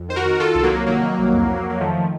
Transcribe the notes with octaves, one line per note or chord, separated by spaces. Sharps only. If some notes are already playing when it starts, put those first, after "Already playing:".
Already playing: F2
D#3 C5
F#4 A#4
D#3
D#3 F4 A4
C2
F#3 A#3
C2
D#3 F#3 A#3
D#3
C2
F2
F2
F2 A#3
D#3 F3 A3
D#3